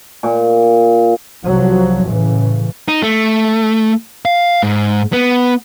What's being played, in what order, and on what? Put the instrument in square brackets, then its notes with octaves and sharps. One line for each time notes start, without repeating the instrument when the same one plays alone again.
[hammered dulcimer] A#2
[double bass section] C2 F3 F#3
A2 C#3 E3
[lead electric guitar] D#4
A3
F5
G#2
B3